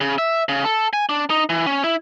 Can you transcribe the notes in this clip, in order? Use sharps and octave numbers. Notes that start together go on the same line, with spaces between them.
C#3
E5
C#3
A4
G#5
D4
D#4
E3
C#4
E4